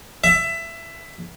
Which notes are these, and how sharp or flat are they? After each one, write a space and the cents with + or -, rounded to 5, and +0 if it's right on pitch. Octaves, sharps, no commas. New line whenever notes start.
E5 +15